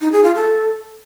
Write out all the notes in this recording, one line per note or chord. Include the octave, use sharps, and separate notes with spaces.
D#4
G#4
F4
A4